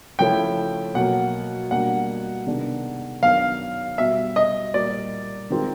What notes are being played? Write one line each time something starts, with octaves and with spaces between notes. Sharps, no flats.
C#3 F3 A3 C#4 E4 G5
B2 F#3 A#3 F#5
B2 G3 A#3 D4 F#5
C3 D#3 G#3 B3 D4
F#2 D#3 F#3 B3 D4 F5
B2 G3 B3 E5
D#5
A#2 G3 A#3 D5
D#3 G#3 C4 F4